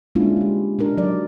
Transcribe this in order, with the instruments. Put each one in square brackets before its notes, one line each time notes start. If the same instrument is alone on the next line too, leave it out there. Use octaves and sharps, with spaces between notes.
[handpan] G#3 A#3 C#4 D4 E4 F4
G#3 G4
D4 D#4 A#4
F#3 D5